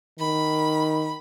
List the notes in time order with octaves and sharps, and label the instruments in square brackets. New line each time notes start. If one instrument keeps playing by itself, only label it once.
[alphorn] D#3 [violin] B5